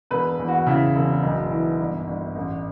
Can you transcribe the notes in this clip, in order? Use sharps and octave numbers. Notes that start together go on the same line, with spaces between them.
E1 B4
E2
F#4
C#3 E4
E1
B1
E3
G1
G1
A1